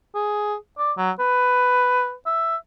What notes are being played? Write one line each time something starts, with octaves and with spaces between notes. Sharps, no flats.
G#4
D5
F#3
B4
E5